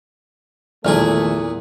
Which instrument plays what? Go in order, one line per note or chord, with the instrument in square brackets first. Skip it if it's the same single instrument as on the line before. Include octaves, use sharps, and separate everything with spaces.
[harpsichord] E2 A#2 G#4 [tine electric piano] D#3 F3 F6 [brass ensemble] A3 A4